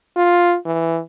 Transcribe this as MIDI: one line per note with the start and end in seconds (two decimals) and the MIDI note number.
0.17 0.56 65
0.66 1.00 52